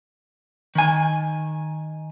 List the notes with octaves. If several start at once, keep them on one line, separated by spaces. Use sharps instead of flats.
D#3 G#5